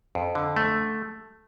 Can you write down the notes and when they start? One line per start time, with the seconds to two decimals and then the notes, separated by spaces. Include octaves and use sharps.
0.15 F2
0.35 D3
0.56 A3